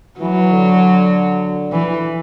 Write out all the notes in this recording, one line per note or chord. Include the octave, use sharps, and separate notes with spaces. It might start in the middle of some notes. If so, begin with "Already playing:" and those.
E3 F#3
D3
E3